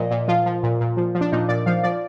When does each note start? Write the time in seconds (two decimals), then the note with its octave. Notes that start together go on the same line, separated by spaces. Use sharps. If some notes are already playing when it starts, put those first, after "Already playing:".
Already playing: A#2 F3 D#5
0.11 A#2
0.28 F3 F4
0.46 F3
0.63 A#2
0.81 A#2
0.97 F3
1.15 F3
1.21 D4
1.32 A#2 D#4
1.49 A#2 D5
1.66 F3 F5
1.83 F3 D5